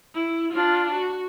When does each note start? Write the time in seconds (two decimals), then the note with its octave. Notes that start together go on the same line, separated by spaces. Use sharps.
0.15 E4
0.53 D4 F4
0.93 F#4